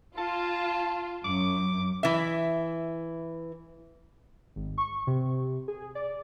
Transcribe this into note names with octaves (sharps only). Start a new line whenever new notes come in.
F4 A5
F#2 D6
E3 E5
G#1
C#6
C3
G#4
D5